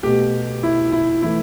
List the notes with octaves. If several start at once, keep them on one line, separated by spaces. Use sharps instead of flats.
B2 A3 G4
E4
E4
E3 A3 E4